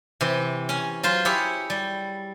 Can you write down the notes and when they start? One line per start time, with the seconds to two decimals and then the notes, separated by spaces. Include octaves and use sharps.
0.21 C3 E3
0.69 C#4 G#5
1.03 F#3 F4 C5
1.25 E4 G4 G#4 C#5 B5
1.70 G3